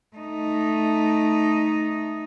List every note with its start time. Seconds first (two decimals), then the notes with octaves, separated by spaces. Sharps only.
0.16 A3 D#4